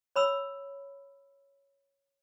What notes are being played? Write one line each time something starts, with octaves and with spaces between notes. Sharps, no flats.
C#5 B5 E6